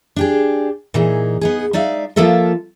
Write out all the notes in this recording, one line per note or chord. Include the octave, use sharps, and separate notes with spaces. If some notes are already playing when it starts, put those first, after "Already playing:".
D4 G4 G#4
A#2 E3 D#4 G#4
B3 D#4 G#4
G#3 D#4 D5 E5 F5
F3 A#3 F4 A4 A#4 E5